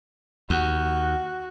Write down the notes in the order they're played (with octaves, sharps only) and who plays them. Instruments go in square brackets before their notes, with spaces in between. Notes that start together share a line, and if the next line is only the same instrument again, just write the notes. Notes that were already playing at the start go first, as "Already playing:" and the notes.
[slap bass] D#2 [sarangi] F#4